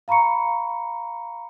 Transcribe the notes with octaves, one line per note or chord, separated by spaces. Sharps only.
F5 A#5 B5 C#6 C#7